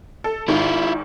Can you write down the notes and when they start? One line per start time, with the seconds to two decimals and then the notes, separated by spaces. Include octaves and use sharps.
0.24 A4
0.48 G#1 G#2 D#3 E4 F4